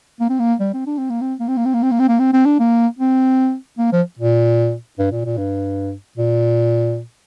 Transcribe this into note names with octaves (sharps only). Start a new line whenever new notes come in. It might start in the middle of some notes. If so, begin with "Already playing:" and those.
A#3
C4
A#3
G3
C4
D4
C4
A#3
C4
A#3
C4
A#3
C4
A#3
C4
A#3
C4
A#3
C4
C4
D4
A#3
C4
A#3
F3
A#2
G2
A#2
A#2
G2
A#2